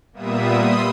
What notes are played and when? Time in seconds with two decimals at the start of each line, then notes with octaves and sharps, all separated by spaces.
0.13 A#2 G3 A#3 B3 E5 D#6
0.58 B5 C6 D#6 E6